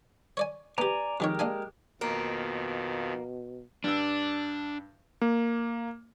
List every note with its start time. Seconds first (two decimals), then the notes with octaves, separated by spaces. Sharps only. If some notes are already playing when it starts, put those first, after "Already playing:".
0.37 C#5 D5 G#5
0.78 B3 G4 D5 G#5 A#5
1.20 F2 D#3 G#3 G4 A#4 C#5
1.39 A#3 D4 G#5
2.01 F2 B2 D#3 A#3
3.84 G2 D4 E6
5.21 A#3